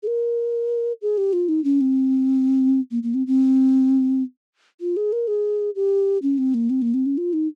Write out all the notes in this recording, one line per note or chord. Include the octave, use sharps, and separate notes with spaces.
G#4
A#4
G#4
G4
F4
D#4
C#4
C4
A#3
A#3
C4
C4
F4
G#4
A#4
G#4
G4
C#4
C4
A#3
C4
A#3
C4
C#4
F4
D#4